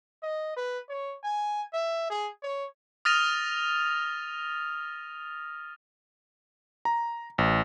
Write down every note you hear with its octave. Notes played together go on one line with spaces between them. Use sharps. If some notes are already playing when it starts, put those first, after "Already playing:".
D#5
B4
C#5
G#5
E5
G#4
C#5
D#6 F6 A6 A#6 D#7 F7
A#5
A1